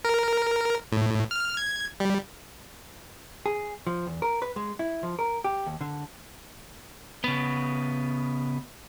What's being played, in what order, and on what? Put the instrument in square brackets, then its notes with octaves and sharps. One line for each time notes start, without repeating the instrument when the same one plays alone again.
[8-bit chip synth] A#4
A2
F6
G#6
G3
[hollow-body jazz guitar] G#4
F3
E2
A#4
B4
G#3
E4
F3
A#4
G4
D#2
D3
[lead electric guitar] C#3 B3